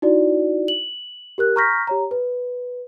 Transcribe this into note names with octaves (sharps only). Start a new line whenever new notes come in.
D#4 E4 F#4 D5
F#7
G4 A#4 F#6
A#5 C#6 F6 G6 A#6 B6
G4 C#5 A#5
B4